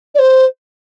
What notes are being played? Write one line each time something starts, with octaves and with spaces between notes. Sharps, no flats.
D5
C5